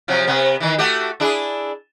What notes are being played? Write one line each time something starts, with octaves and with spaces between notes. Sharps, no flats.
C3 F3 F#3
C3 B3
D#3 E3
A3 F#4 G4
D4 E4 G#4